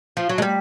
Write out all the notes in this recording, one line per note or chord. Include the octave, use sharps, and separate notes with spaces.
F3
F#3
G#3
G3